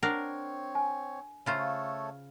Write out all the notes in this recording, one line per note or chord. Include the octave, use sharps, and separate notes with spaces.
C4 D4 A#4 C#5 F#5
G#5
C#3 A3 F4 A4 C5 C#5